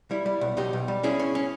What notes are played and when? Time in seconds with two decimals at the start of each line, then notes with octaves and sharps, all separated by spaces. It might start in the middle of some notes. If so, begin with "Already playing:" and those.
0.11 G3 E4
0.26 G3
0.41 B1
0.57 B1 D#4 G4
0.73 B1
0.88 G3
1.03 C#4 E4 G#4
1.19 C#4
1.35 C#4